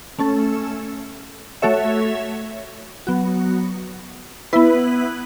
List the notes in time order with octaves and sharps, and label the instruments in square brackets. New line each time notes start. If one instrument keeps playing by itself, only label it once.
[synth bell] A3 C#4 A4
A3 F#4 A4 C#5 E5
F#3 B3 F#4
B3 E4 B4